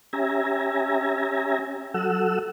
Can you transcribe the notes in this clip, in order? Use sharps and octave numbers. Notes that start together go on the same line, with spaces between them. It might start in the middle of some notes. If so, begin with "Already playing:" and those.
C#4 G4 E5 G#5 A#5
F#3 A4 F#5 E6